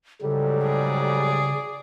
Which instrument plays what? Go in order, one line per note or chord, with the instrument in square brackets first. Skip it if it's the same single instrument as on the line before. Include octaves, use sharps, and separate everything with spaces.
[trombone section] G#2 F#3 G3 [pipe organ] C#3 [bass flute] A4
[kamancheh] G#4 D5